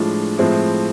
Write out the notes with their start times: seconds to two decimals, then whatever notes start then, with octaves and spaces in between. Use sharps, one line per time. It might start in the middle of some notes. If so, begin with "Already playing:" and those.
Already playing: A2 F3 G#3 D4 F4
0.38 A2 F3 G#3 C4 E4